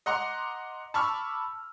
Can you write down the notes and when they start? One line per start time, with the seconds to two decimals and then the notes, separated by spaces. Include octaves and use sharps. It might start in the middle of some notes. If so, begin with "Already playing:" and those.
0.06 D#5 F#5 A#5 C6 D6
0.94 A5 B5 C#6 D6 E6 F6